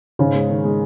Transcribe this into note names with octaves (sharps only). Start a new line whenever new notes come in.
G#2 C#3
G#3
D#3
G#3